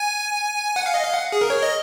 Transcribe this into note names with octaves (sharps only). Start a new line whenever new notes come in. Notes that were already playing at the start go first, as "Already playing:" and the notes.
Already playing: G#5
F#5
F5
D#5
F5
F#5
G#4
A#4
C#5
D#5